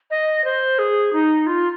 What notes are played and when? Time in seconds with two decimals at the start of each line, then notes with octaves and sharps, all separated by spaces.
0.10 D#5
0.44 C5
0.79 G#4
1.13 D#4
1.47 F4